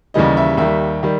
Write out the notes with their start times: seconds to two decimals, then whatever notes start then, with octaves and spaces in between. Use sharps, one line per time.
0.14 D#2 C#3 E3 G3 D#5
0.37 E5
0.57 D#2 D#3 G3 E5
1.03 D#3 G3